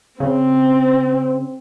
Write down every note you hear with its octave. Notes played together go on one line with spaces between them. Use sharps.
C#3 C4